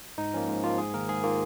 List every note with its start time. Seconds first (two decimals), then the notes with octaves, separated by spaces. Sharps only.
0.18 G#2 D#4
0.34 F3 A#3 C#4
0.48 G#2
0.63 F3 A#3 F4
0.78 G#2 G#4
0.94 D#3 A#3 A#4
1.09 G#2 G#4
1.23 D#3 A#3 F4